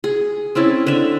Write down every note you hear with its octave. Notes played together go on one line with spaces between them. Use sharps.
G#4
C4 C#4 E4 A5
D3 E5